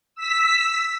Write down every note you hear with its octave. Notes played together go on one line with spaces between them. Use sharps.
E6 B6